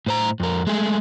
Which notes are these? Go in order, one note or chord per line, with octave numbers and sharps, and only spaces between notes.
A2 C5 A#5
F2 A#4
G#3 A3 G#4